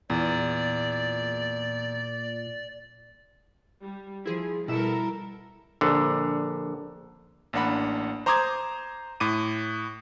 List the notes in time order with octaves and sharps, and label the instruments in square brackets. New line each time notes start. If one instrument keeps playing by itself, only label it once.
[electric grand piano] E2 [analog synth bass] A#2 [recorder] D5
[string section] G3
[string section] F3 [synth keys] E4 G#4
[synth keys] B2 E7 [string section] G3 A4 A#4 [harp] E4
[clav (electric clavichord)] A#1 D3
[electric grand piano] A1 A#3 D4 F#5 B5
C5 A#5 C6 D6 D#6 G#6
A2 D6 D#7